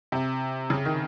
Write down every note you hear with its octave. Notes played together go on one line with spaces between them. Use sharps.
C3
C#3
D#3